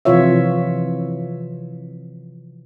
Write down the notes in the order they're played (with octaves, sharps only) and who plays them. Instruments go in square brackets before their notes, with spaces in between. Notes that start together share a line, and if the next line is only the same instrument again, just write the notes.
[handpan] C3 E3 F3 F4 C#5 E5